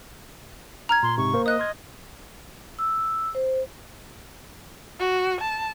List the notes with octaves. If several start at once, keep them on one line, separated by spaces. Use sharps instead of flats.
A#5 F6 G#6
A#2 C6
G#2 C3 C#6
A#3 A#4 C5
D#5 D#6 F#6
C6 F6 G#6
E6
C5
F#4
A5